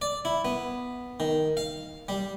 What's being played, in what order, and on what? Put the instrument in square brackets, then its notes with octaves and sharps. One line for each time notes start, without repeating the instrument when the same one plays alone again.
[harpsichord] D5
E4
B3
D#3
F5
G3